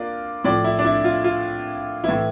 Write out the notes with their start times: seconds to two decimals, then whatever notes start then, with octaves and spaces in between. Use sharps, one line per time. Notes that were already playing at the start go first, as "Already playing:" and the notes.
Already playing: A#3 D4 F4 D5
0.44 A2 F3 D5
0.64 E4
0.79 D4
0.85 E4
1.04 F4
1.24 F4
2.04 A2 E3 E4